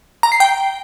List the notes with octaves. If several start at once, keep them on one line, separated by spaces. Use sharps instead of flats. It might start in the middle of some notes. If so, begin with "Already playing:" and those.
A#5
C7
G5